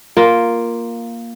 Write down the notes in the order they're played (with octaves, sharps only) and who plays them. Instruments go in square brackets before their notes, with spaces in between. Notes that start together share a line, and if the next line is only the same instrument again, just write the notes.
[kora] A#3 F4